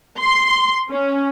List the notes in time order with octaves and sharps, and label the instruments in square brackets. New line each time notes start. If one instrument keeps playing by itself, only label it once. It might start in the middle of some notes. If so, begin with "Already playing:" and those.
[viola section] C6
C#4